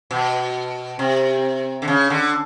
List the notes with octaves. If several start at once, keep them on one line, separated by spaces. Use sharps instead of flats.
B2
C3
D3
C#3
D3